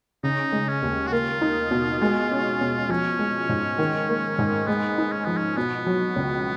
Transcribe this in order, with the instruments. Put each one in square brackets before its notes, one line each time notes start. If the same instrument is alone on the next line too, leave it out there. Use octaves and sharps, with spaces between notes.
[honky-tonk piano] C#3 [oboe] D#4
[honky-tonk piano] G#3
[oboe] C#4
[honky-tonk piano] D#2
[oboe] F#4
[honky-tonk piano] A#3 [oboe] F4
[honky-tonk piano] D#4
B2
G#3
C#4
B2
[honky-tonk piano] F3 [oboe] C#4
[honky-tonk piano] G#3
G#2
D#3
A#3
G#2
[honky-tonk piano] G#3 [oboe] B3
[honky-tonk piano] D#4
[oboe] C#4
[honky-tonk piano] F3 [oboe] B3
[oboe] C#4
[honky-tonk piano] B2 [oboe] B3
[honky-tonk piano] F#3
C#2